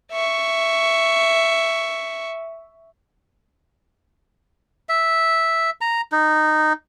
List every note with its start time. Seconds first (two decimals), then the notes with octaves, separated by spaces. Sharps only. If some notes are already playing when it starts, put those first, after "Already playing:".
0.12 E5 C#6
4.89 E5
5.81 A#5
6.12 D#4